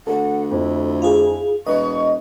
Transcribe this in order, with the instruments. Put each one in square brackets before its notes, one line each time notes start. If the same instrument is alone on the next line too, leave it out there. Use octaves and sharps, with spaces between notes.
[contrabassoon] D2 [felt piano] A4 [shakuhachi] F#5
[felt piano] F2 [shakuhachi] E4
[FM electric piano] F4 G#4
[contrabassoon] E1 [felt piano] B4 [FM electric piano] D#5 [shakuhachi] C#6